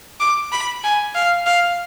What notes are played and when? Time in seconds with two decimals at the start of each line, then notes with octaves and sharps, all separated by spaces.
0.20 D6
0.52 B5
0.84 G#5
1.15 F5
1.46 F5